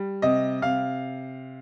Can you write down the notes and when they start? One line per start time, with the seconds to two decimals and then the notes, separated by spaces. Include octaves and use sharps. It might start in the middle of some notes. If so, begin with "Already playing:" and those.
Already playing: G3
0.22 C3 D#5
0.62 C3 F5